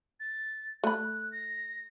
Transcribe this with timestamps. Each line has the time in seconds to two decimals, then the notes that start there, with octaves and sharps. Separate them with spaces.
0.20 A6
0.84 A3 B5 F#6
1.32 A#6